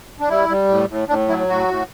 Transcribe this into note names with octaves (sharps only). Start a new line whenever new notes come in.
D4
G3 E4
G3
A2
A2
A2 D4
F#3 E4
A2 F#4
A2